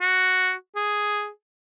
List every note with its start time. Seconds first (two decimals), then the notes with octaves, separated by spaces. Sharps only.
0.01 F#4
0.76 G#4